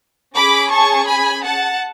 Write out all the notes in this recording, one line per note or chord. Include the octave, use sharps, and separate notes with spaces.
C#4 G#4 B5 D6
A5 C#6
G#5 B5
F#5 A5